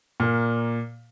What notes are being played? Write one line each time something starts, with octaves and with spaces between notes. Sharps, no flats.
A#2 A#3